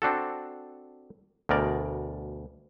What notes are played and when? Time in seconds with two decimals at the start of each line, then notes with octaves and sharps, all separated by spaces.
0.02 C4 D4 F#4 A4
1.49 D2 B2 A#4 D5